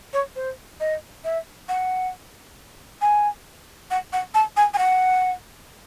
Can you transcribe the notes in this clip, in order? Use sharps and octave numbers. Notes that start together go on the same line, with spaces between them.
C#5
C5
D#5
E5
F#5
G#5
F#5
F#5
A5
G#5
G#5
F#5